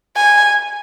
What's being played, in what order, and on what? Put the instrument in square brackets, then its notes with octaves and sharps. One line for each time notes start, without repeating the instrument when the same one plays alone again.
[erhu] G#5